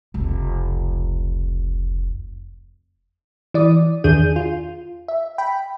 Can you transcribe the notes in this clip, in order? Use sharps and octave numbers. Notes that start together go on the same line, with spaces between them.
F1 C#2
E3 D5 D#6
E2 D#3 D4 G#4 G6 D#7
F4
E5
G5 B5